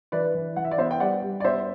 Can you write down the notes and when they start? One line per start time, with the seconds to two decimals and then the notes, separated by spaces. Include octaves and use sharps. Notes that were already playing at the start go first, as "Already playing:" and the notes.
0.12 E3 B4 D5
0.34 E3
0.56 E3 F#5
0.64 E5
0.71 D5
0.78 B3 C5 E5
0.91 G5
1.00 G3 D5 F#5
1.22 G3
1.40 D5
1.44 B3 C5 E5